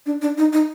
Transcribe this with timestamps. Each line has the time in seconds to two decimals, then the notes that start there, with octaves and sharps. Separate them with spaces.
0.06 D4
0.22 D4
0.38 D#4
0.53 D#4